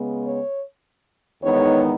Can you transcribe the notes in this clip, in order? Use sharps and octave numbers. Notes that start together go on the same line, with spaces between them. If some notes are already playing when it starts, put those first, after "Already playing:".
Already playing: C#3 G#3 B3
C#5
E2 D#3 G#3 B3 D#4 C#5